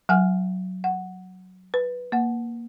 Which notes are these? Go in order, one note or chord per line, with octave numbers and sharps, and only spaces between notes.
F#3 F#5 G#5 F6
F#5
B4
A#3 F#5